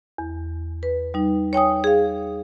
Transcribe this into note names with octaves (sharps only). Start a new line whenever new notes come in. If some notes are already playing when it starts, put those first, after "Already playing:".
E2
B4
G3 D#4
C#5 G5 G#5 D#6
G#4 F5